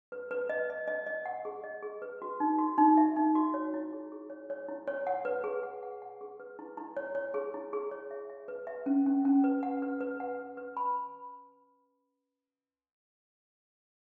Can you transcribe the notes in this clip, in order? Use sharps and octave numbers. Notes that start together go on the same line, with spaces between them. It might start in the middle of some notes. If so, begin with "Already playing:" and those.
B4
B4
D#5
D#5
D#5
D#5
F#5
G#4
D#5
G#4
B4
F#4
D#4
F#4
D#4
E5
D#4
F#4
C#5
E4
G#4
G#4
C#5
C#5
E4
C#5
F#5
B4
G#4
F#5
F#5
F#5
G#4
B4
E4
E4
C#5
C#5
G#4
E4
G#4
C#5
E5
E5
B4
E5
C#4
C#4
C#4
B4
F#5
B4
B4
F#5
B4
B4
B5